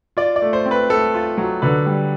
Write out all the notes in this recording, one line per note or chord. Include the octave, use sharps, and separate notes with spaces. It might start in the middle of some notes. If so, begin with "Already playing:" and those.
F4 D5
D5
A3
C5
C4
B4
A3 A4
F4
F#3
D3 B4
G3